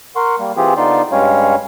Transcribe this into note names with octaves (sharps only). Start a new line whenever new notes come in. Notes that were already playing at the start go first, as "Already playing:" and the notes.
A#4 F#5 C6 C#6
G3 A#3
E3 C4 F4 G4 G#4
D3 B3 D#4 F4 D5 C6
G2 G3 G#3 C#4 C#5 F5